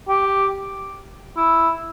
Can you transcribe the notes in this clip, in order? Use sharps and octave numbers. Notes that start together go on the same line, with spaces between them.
G4
E4